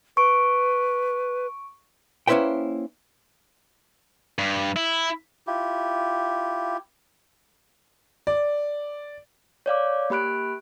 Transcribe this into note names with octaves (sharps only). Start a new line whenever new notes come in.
B4 C#6 D7
A#3 C#4 E4 B4 C5 G5
G2
E4
E4 F4 G4
D5
C#5 D5 F5 D6
A#3 G4 B5 F#6 D7